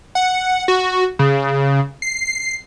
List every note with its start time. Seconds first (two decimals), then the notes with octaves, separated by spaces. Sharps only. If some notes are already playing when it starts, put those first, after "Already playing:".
0.15 F#5
0.68 F#4
1.19 C#3
2.02 C7
2.26 C7